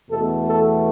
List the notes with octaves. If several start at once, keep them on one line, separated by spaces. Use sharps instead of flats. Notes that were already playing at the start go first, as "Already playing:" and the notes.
E2 B2 A3 A4
A4